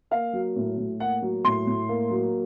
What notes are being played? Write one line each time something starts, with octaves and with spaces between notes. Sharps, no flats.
A#3 F5
F#3
A2
A2
A#3 F#5
F#3
A2 C6
A2
A#3
F#3